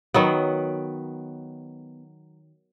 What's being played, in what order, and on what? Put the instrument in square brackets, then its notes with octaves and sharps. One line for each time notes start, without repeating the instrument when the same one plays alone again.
[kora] D#3 F#3 B3